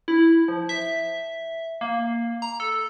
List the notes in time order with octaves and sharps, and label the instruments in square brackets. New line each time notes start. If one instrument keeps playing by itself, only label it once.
[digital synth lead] E4
F3
E5
A#3
A#5
A4